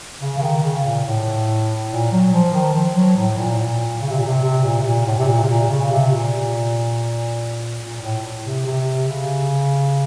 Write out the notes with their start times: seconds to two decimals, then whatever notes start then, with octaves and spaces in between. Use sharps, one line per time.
0.21 C#3
0.38 C#3
0.42 D#3
0.63 C#3
0.85 A#2
1.05 A2
1.90 A#2
2.12 F#3
2.33 F3
2.53 D#3
2.74 F3
2.95 F#3
3.17 A2
3.37 A#2
3.59 A#2
4.01 C#3
4.10 C3
4.19 A#2
4.26 C3
4.43 C3
4.64 A#2
4.80 C3
4.85 A#2
5.06 A2
5.18 C3
5.28 A#2
5.44 C3
5.48 A#2
5.70 C#3
5.91 C3
6.12 A#2
7.81 A#2
8.02 A2
8.44 C3
8.66 C3
9.08 C#3